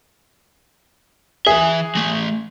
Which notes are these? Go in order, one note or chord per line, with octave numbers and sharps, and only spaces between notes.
E3 G#4 E5
E3 A3